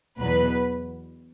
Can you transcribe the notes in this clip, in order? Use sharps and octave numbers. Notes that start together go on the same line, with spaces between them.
E2 B2 F#3 B4